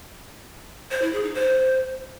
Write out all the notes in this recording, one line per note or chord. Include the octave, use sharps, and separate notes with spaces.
C5
E4
G#4
D#4
C5